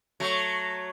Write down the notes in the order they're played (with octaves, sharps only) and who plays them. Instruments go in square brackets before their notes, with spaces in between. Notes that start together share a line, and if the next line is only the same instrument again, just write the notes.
[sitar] F#3 A3